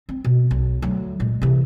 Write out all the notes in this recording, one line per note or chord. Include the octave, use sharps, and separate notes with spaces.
C4
B2
B1
D2 F#3
A#2 G#3
C3 E3